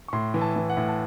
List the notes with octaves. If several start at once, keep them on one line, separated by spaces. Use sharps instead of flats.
C#6
A2 C6
E3
A5
E3
F#5
A2
A5